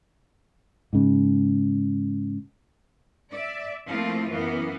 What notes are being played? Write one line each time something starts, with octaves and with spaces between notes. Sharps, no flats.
G#2 C#3
D5 E5
F3 A3 A#3 C4 E4 F4
F#2 E3 A#3 B3